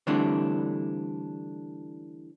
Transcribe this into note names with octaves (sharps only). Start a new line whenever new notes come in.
D3 E3 G3 A3 C4 D4